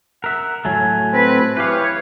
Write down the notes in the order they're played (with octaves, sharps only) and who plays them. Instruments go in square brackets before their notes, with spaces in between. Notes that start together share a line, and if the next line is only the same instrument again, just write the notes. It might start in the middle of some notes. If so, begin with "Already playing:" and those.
[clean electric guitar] A#4 E5 [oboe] F#5
[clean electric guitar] A2 F#3 A3 [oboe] G#5
[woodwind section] C4 B4
[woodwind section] E3 E4 C#5 [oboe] G4 [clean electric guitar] B4 F5